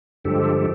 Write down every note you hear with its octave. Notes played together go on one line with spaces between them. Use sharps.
G2 D3 F3 G#3 G4 A4